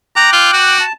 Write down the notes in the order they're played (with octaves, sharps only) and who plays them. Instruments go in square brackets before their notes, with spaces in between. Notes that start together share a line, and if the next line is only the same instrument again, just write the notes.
[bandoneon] G5 D6 F#6 [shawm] A#5
[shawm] F4
F#4
[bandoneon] A5